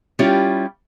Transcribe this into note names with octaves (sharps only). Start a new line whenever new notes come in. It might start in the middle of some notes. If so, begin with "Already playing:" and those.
G3 C#4 E4 F4 G4